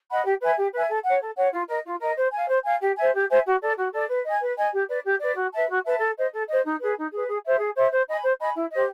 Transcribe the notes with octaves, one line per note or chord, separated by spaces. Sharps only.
D#5 F#5 B5
G4
B4 E5 G#5
G4
B4 E5 G#5
A4
C#5 F#5
A4
C#5 F#5
F4
A#4 D#5
F4
A#4 D#5
C5
F5 G#5
C5
F5 G#5
G4
C5 E5 G#5
G4
C5 E5 G#5
F#4
A4 D5
F#4
A4 D5
B4
D#5 G#5
B4
D#5 G#5
G4
B4 D5
G4
B4 D5
F#4
B4 E5 A5
F#4
B4 E5 A5
A4
C5 D#5
A4
C5 D#5
D#4
G#4 B4
D#4
G#4 B4
G#4
C5 E5
G#4
C5 E5
C5
D#5 G#5 B5
C5
D#5 G#5 B5
E4
G4 C5 D#5